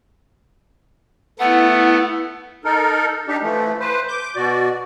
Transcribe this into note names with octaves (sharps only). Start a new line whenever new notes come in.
A3 B3 E4 F#5
D#4 A4 A#4
D4 D#4 G4
E3 F3 A3
B4 C5
D6 G6
B2 F#4 D5